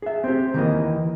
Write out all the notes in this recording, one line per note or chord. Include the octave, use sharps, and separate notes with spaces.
G#4 E5
C4 G4
D#3 E3 A#3 D#5